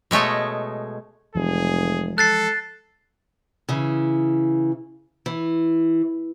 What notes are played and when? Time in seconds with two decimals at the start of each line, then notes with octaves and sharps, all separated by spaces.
0.11 B2 G#3 A3 C#5 D#5
1.35 F1 E3 F3 G#3 G#4
2.18 A4 F#6 A6 C7
3.69 C#3 E3
5.26 E3